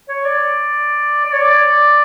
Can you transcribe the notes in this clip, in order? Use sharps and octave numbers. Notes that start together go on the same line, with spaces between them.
C#5
D5
D5
C#5
D5